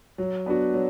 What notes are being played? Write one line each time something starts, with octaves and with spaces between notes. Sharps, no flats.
F#3
B3 D4 F#4
F#3